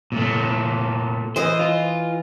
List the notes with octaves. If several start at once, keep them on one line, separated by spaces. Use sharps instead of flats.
A#2 A3
E3 C5 D#5
F4